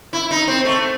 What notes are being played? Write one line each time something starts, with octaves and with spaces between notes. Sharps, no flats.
E4
D#4
C4
A3